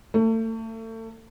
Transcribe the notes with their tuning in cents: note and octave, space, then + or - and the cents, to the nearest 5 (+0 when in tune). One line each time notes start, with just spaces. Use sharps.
A3 +35